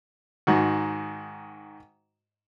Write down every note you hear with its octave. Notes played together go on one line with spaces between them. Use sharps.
G#2 D#3 F#4